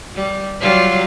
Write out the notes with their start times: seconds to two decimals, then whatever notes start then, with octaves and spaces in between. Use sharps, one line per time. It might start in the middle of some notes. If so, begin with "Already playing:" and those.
0.15 G3
0.61 F#3 G3 F4